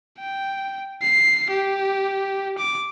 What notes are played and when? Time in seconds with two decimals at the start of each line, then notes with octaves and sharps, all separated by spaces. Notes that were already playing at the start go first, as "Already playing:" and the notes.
0.19 G5
1.02 C7
1.50 G4
2.58 D6